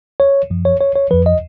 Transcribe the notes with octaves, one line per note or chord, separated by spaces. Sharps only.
C#5
F#2 F3
C#5
C#5
C#5
F2 F3 B4
D#5